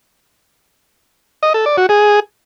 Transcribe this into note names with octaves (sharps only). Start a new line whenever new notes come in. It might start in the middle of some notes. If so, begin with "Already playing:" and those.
D#5
A4
D5
F#4
G#4